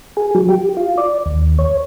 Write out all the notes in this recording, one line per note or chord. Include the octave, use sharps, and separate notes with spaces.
G#4
F#3
G4
F4
D5
D#2
C#5